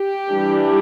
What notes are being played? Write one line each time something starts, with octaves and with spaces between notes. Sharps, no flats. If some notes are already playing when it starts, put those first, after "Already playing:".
Already playing: G4
E3 G3 D4